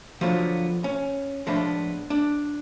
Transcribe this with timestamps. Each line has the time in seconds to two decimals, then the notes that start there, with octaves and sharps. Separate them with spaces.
0.21 D3 F3 F#3 B3 F4
0.84 C#4
1.47 A2 F3 G#3 B3 D4
2.10 D4